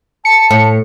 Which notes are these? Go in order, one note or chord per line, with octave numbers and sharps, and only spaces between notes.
A5 C#7
A2